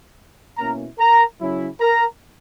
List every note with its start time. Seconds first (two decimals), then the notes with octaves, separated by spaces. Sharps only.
0.58 B2 A#3 C#4 E4 A#4 A#5
0.98 A#4 A#5
1.39 C#3 F#3 C#4 E4
1.80 A#4 A#5